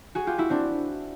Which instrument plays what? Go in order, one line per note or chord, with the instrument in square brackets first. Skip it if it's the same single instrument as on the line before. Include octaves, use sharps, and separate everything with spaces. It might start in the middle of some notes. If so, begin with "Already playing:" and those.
[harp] F#4 G#4
F4 G4
E4 F#4
C4 D4